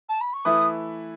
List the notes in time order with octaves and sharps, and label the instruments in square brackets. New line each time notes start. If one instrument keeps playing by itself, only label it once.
[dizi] A5
B5
C#6
[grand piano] E3 A3 E4 B4 [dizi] D#6